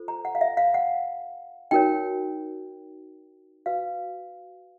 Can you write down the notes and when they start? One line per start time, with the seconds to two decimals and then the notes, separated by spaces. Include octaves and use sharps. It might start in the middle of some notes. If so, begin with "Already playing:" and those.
Already playing: F4 A4 C5
0.08 A#5
0.25 F#5
0.35 F5
0.41 E5
0.57 F5
0.74 F#5
1.71 D#4 F#4 A#4 C#5 G5
3.66 F#4 B4 F5